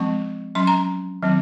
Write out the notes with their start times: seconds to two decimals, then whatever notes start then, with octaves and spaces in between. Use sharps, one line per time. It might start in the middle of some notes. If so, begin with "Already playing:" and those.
Already playing: F3 G#3 C4 C#6
0.55 F#3 C#4 C6
0.67 A#5
1.22 D#3 F#3 C4